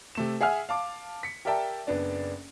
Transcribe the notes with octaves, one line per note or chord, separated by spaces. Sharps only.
C3 A3 E7
G#4 E5 F#5 G#5 F6
F5 A5 D6
B6 C#7
G4 A#4 D5 E5 G5 A5
F#1 B3 D4 D5